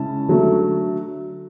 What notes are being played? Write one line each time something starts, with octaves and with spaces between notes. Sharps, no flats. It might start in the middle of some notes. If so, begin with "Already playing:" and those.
Already playing: C#3 G#3 C#4 E4 A5
D3 F#3 A3